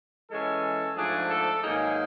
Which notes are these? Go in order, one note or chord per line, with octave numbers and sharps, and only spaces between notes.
E3 G#3 C#4 A4
G#2 F3 A3 D4 G#4
A4
G#2 D#3 F#3 A#3 D#4 G#4